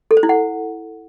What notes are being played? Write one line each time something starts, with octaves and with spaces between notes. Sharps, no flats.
A4
C5
E4
F#5